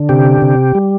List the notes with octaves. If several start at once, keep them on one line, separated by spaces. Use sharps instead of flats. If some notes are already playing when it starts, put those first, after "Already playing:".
Already playing: D3
C3 G4
C3
G3